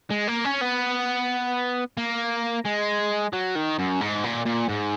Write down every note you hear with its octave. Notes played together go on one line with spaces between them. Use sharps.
G#3
A#3
C#4
B3
A#3
G#3
F#3
D#3
F#2
G#2
A#2
A#2
G#2